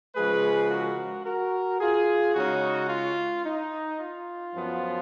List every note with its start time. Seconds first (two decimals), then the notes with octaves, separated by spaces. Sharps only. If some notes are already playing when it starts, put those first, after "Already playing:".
0.15 C#3 F3 G#3 G#4 B4
0.70 F#4 A#4
1.25 F#4 A#4
1.80 F4 G#4
2.34 C#3 G#3 C#4 D#4 F#4
2.89 F4
3.45 D#4
3.99 F4
4.54 F#2 F3 B3